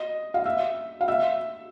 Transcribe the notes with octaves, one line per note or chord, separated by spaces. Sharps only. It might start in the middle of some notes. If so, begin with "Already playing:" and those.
Already playing: D#5
F5
E5
F5
E5